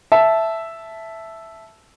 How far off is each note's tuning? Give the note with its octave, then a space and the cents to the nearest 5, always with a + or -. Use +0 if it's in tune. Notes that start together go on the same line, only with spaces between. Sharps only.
E5 +0 A5 -10